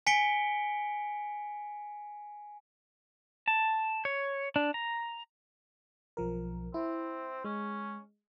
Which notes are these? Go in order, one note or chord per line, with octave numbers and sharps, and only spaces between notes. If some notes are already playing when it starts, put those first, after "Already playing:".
G#5 B6 C#7 D7 G7
A5
C#5
D4
A#5
B1 F3 A#4
C4 E4
G#3 C#4